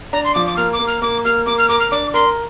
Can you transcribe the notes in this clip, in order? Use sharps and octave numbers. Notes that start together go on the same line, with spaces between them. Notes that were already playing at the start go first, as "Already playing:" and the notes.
D4 A#5
C6
F3 D6
D6
A#3 F6
D6
A#3
F6
A#3 D6
A#3 F6
A#3 D6
F6
A#4 D6
F6
D4 D6
A#4 C6